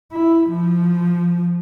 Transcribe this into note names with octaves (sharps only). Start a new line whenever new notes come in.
E4
F3